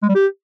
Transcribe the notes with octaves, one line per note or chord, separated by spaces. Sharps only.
G#3
G3
G4